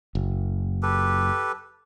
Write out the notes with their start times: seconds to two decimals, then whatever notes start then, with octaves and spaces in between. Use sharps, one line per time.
0.15 F#1
0.83 G4 A4 B4